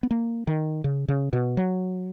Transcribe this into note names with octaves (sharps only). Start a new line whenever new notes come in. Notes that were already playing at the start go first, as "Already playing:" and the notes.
B3
A#3
D#3
C#3
C#3
B2
F#3